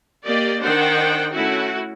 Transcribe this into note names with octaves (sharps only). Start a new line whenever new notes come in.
A#3 G4 D5 D#5
D#3 D4 C5 F#5 G5
A3 C#4 E4 F#4